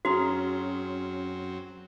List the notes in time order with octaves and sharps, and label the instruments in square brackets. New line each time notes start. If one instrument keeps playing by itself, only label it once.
[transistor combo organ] F#2 F#3 C4 [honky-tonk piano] C#4 [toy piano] F#4 [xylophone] G#4 A#5 D#6